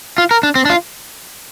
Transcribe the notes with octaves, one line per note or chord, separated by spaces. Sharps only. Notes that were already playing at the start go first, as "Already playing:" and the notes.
F4
A#4
D4
C4
D4
F4